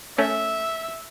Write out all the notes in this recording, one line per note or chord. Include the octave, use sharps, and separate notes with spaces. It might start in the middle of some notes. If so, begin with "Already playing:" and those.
A3 C#4 E5